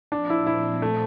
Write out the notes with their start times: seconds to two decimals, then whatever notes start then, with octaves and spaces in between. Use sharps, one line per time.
0.12 A#2 F3 C4 D4
0.30 E4
0.47 E4
0.82 A3